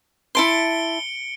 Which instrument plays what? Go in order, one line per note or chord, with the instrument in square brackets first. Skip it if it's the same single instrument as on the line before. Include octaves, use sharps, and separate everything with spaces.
[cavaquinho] E4 A5 C6 [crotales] C#7 D7 G7